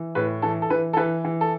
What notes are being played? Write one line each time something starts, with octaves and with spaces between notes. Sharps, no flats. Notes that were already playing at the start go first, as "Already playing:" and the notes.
Already playing: E3
A2 B4
E3 A4
A4
E3 B4
A4
E3 B4
E3
A4